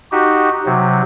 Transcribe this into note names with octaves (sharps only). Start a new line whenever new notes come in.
D#4 F#4 G4
C3 F#3